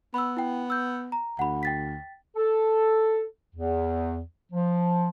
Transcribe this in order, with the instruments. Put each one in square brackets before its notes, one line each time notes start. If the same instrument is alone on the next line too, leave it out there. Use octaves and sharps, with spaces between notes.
[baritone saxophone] B3 [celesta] B5 E6
[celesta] E4 G5
E6 G6
A#5
[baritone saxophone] D2 [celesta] F#5 B5
[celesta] G5 A6 B6
[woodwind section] A4
E2
F3